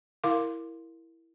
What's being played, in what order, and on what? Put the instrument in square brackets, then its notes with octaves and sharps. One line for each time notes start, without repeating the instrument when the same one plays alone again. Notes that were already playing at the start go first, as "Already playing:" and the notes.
[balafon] E4 A#4 F5 C6 D6